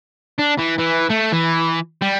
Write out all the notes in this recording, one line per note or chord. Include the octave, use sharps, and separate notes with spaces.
D4
E3
E3
A3
E3
G3